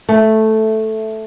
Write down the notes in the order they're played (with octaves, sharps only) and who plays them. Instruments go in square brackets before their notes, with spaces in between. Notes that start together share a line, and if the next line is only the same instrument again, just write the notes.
[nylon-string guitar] A3